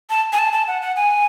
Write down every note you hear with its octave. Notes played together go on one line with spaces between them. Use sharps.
A5
G#5
A5
A5
F#5
F#5
G#5